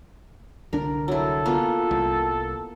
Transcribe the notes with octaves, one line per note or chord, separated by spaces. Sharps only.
C2 D3 D4 A#4
F#3 E4 A4
A#3 B3 F4
C2